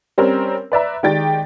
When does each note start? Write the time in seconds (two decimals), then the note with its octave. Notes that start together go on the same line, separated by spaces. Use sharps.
0.18 G3 C4 C#4 A#4
0.72 B4 D5 E5 A#5
1.03 D#3 G#3 G4 D5 G5 A6